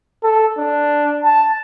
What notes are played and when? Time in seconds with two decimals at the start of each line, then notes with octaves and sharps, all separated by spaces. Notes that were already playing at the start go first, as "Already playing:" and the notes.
0.24 A4
0.58 D4
1.24 A5